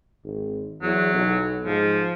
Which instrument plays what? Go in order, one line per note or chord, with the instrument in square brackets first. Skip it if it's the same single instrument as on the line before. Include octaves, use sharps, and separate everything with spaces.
[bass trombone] G#1
[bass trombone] E2 [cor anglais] F#3
[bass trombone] B1
[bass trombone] G#2 [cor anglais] F3